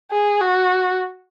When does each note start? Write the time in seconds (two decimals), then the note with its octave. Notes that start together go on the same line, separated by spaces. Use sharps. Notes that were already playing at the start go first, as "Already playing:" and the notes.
0.11 G#4
0.41 F#4